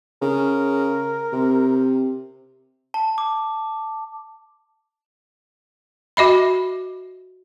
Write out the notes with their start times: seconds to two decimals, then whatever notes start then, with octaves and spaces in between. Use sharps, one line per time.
0.22 C#3 A#4
1.32 C3
2.94 A5
3.18 D6
6.17 F#4 D#5 E5 B5